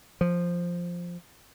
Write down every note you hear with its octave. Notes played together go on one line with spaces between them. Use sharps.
F3